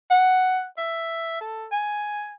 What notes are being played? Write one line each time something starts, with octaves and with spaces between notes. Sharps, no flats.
F#5
E5
A4
G#5